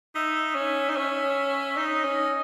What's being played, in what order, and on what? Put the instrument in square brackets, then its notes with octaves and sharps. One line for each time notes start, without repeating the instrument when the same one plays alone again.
[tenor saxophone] D#4 [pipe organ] E5
[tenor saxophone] C#4
D#4
C#4
[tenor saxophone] D#4 [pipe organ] D#5
[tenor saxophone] C#4